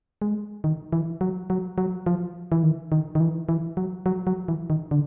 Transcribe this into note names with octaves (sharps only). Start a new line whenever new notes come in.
G#3
D#3
E3
F#3
F#3
F#3
F3
E3
D#3
D#3
D#3
E3
E3
F#3
F#3
F#3
E3
D#3
D3